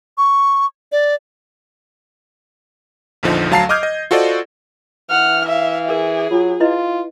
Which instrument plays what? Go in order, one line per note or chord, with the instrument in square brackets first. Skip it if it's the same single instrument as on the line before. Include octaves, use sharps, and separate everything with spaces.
[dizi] C#6
D5
[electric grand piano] A#1 E2 D3 F3 D#4
D2 F#3 F5 A5 A#5 C7
D#5 D6 D#6 F6 G6 G#6
D#5
F4 F#4 A4 C5 D5 D#5
[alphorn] E3 [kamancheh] F#5 F6
[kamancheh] E5 F5
[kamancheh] G#4 [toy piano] A#4
[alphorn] F#3 [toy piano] F4
[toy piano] E4 B4 D#5 [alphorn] F4